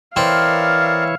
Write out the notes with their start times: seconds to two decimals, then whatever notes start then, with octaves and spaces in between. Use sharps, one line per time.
0.16 E3 C4 E4 A#4 C#5 D5 F5